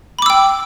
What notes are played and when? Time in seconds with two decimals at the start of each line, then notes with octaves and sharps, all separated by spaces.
0.19 B5
0.22 D6
0.26 E6
0.30 G5